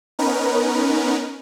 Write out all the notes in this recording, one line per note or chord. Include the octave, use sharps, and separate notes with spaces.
B3 C#4 D#4 A#4 B4